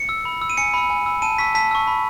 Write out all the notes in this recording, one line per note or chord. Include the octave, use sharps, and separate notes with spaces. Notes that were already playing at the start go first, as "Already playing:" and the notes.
Already playing: C#7
E6
B5
E6
D#7
G#5 C#7
B5 E6
G#5
B5 E6
A5 D#7
C#6 E6 B6
A5 B6
C#6 E6
B5